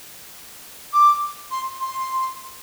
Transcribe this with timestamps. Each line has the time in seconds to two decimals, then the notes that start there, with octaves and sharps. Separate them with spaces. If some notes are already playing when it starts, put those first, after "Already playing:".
0.93 D6
1.51 C6
1.81 C6